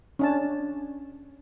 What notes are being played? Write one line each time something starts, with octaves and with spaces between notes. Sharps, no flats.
C#4 D4 A5